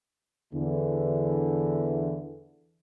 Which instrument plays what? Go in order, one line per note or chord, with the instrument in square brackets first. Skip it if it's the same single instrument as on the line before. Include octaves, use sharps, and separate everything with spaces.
[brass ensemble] E2 D3 E3